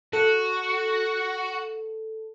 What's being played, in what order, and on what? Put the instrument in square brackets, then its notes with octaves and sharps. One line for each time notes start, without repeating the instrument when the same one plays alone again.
[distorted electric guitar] F#4 [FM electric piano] A4